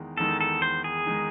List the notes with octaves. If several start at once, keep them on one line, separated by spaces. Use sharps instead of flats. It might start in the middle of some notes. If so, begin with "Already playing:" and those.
Already playing: E2 D#3 G#3 D#4
E2 D#3 G#3 D#4 A4
A4
C5
G#4
D#3 G#3 D#4